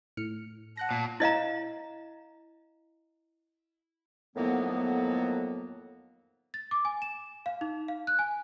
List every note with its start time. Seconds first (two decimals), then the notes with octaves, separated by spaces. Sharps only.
0.17 A2 F6 C#7
0.77 F#5 A5 F#6 A#6
0.91 A#2
1.20 E4 D#5 F5 A#5
4.36 F2 A2 D#3 F#3 A#3 B3
6.54 A6
6.71 D6
6.85 G#5
7.02 E7
7.46 F5
7.61 D#4
7.88 F5
8.07 F#6
8.19 G#5